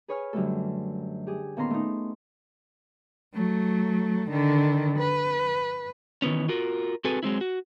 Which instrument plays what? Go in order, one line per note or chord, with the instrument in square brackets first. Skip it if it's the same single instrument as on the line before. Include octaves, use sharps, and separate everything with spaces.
[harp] G#4 B4 C#5 G#5 F6
F#2 D3 F#3 G3 A3 A4
G4 G#4
A#2 D#3 B3 C#4 A#5 C6
A3 D#4
[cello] F#3 A3
D3 D#3
B4
[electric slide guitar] D#3 E3 B3 C#4
F4 F#4 A#4
C4 F#4 G#4 A4 B4
F#3 G#3 C4 E4
F#4